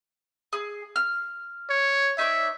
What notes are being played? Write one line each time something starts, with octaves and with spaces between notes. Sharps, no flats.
G#4
F6
C#5
D#4 C#5 D5 E5